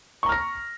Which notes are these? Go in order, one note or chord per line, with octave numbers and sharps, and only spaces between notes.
A#5 C#6 F6 A#6